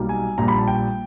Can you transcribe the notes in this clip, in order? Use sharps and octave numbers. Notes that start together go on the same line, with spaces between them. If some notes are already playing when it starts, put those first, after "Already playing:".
Already playing: B1 B2 G3 A#3 D#4
G#5
A#1 A#2 G3 A#5
B5
A5
G5